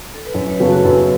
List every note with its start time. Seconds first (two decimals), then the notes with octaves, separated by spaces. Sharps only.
0.14 A4
0.25 B4
0.35 F#2 C#5
0.48 B4
0.60 C#3 F#3 B3 A4 B4
0.72 F#4
0.84 F#2 A4